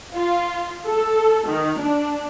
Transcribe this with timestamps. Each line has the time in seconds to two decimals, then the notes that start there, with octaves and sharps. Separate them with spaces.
0.14 F4
0.87 A4
1.48 D#3
1.80 D4